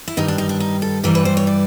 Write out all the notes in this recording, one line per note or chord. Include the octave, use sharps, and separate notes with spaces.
E4
G2 D#3 G3 D#4
D4
D#4
D4
D#4
A4
G2 E3 G3 A#4
B4
C5
C#5
D5